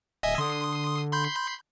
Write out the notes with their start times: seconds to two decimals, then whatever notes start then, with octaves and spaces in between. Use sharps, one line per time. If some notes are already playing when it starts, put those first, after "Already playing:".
0.23 D1 D#5 E5 G#5
0.38 D3 C6 D#6
1.13 B5 C6 G6